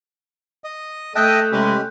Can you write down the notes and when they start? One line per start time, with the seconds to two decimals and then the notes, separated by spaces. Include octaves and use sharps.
0.64 D#5
1.16 A3 D#5 E5 G5 A5 F#6 G6
1.52 C3 G#3 C#4 G4 B4